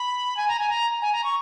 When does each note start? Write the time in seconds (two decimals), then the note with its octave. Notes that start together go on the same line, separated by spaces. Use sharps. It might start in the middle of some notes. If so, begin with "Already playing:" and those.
Already playing: B5
0.37 G#5
0.48 A#5
0.59 G#5
0.70 A#5
1.02 G#5
1.13 A#5
1.24 C#6